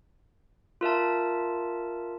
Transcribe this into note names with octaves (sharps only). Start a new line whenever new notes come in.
F4 A#4 E5 A5